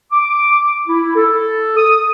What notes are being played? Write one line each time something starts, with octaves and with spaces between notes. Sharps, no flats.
D6
E4
A4
D#6